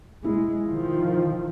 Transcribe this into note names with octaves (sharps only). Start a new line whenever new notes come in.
G#3 E4
D#3 F3